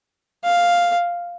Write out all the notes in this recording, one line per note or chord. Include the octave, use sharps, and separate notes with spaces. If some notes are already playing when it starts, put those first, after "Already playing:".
F5